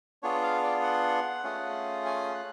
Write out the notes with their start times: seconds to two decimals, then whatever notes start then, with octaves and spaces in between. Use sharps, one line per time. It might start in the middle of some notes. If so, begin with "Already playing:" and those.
0.23 B3 D4 F4 G#4 C#5
0.43 F5
0.63 D5
0.83 F#5
1.44 A3 C#4 F4 G#4
2.06 G#5
2.35 F#6